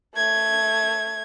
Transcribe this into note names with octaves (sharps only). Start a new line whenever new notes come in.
A3 G#6